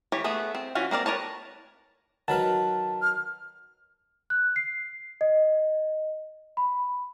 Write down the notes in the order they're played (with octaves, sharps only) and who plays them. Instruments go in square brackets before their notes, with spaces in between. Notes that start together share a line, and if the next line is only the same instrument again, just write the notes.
[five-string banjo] E3 G4 C#5
A3 B3 G#4 E5
C4
E3 C#4 F4 F#4
A#3 C4 A#4 D5
A#4 B4 C#5 A5
[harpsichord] D#3 F#3 B4 [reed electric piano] F#5 A#5 F6 [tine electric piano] A5
[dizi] F6
[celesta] F#6
C7
D#5
B5